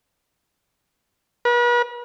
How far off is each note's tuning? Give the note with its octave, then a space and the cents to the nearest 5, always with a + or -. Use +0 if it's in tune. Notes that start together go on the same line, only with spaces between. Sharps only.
B4 -40